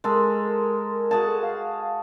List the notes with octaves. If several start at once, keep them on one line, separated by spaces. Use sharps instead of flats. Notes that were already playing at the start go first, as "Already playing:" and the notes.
G#3 A4 A#4
F#4 G#4 A5
A4
F5